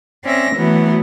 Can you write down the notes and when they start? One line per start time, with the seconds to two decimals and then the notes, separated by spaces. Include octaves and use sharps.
0.24 C4 C#4 D5 E5 A#6
0.55 E3 F#3 A3 B3